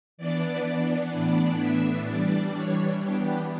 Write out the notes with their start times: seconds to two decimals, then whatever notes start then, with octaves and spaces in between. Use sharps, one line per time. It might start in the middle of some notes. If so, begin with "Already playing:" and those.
0.18 E3 B3 D4 D5
0.65 D5
1.12 A2 E3 B3 D4 D5
1.60 E5
2.08 E3 G3 D4 D5
2.55 C#5
3.02 E3 B3 D4 G4